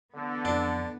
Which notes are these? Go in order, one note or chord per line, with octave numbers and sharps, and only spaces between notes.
D3 E3 B3
F2 D4